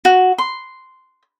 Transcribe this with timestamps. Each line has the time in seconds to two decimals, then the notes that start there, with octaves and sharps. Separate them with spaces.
0.05 F#4
0.38 C6